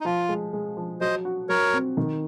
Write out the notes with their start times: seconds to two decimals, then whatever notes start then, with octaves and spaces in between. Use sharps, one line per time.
0.01 D#4
0.05 F3 F4
0.29 G#3
0.53 G#3
0.77 F3
1.01 F#3 C5 D#5
1.25 F#4
1.49 F#3 A#4 C#5
1.73 C4
1.97 D#3